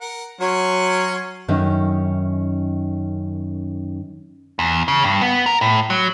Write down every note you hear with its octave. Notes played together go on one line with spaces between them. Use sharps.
A#4 F#5
F#3 C#4 C#5 C6
F#2 D#3 C#4 D#4 E5
E2
C#3
G2
B3
A#4
A2
F#3